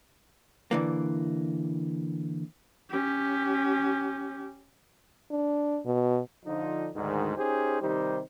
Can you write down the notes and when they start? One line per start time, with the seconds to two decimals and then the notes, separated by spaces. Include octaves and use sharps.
0.71 D3 E3 A#3
2.90 C#4 G4
5.31 D4
5.86 B2
6.46 D3 F3 D#4
6.95 D2 G#2 D#3
7.36 C#4 D#4 G4 G#4 C5
7.81 C3 D#3 G3 D#4 G4 C5